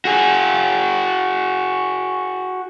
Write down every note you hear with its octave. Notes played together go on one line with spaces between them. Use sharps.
F#4 G#4